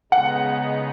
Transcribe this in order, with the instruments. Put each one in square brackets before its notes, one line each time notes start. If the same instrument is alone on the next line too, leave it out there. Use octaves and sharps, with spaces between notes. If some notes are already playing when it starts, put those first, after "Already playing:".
[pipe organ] C#3 G#3 B3 D#4 [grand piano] F#5